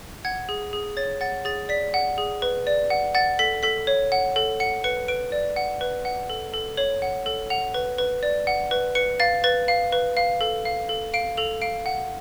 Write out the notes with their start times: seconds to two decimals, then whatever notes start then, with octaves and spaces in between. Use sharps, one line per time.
0.25 F#5 G#6
0.49 G#4
0.73 G#4
0.97 C#5 A6
1.21 F#5 A6
1.45 G#4 A6
1.69 D5 B6
1.94 F#5
2.18 G#4
2.42 B4
2.67 D5
2.90 F#5
3.15 F#5 A6
3.39 A4 B6
3.63 A4 B6
3.87 C#5
4.12 F#5
4.36 A4
4.60 F#5 C#7
4.84 B4 C#7
5.08 B4 D7
5.32 D5
5.56 F#5
5.81 B4
6.05 F#5
6.30 A4
6.54 A4
6.77 C#5 F#7
7.02 F#5
7.26 A4
7.50 F#5 F7
7.74 B4
7.98 B4
8.23 D5
8.47 F#5
8.71 B4
8.95 B4 C#7
9.20 F5 A6
9.44 B4 A6
9.68 F5
9.93 B4
10.17 F5
10.41 A4
10.65 F5
10.89 A4
11.14 F5 D7
11.37 A4 F7
11.62 F5 D7
11.86 F#5